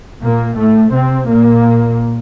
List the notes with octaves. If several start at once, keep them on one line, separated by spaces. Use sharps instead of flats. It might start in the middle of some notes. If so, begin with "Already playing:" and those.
A#2 A#3
A2 A3
C3 C4
A#2 A#3